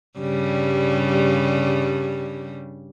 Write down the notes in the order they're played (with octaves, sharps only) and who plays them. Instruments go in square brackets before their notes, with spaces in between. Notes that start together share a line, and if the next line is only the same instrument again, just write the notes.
[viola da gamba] G2 C#3 G3